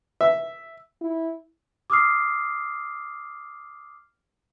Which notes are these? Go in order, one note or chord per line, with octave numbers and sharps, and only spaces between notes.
E5
E4
D6 D#6 F6 C7